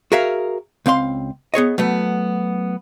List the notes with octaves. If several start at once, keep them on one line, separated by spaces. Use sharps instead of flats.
F#4 G#4 A#4 E5 F5
C#2 C4 F5 C6
B3 G#4 C#5 D#5
F#3 A3 B3